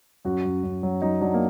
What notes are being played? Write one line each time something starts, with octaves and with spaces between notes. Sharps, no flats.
F#2 F#4
F#2
F#2
F#3
F#3 D#4
F#3 D4
A#3